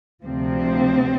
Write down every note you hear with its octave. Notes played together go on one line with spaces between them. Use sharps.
D2 C3 F3 C4